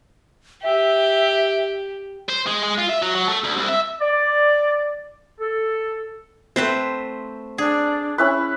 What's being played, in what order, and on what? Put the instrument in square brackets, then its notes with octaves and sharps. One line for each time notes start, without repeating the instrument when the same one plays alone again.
[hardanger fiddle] G4 [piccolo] E5
[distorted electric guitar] C5
G#3
G#3
F4
E5
F#3
F#3
A3
D2
C2
E5
[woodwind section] D5
A4
[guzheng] A3 B4 C5 [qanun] C4
[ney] D4 [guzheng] G#4
[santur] C#4 E4 B4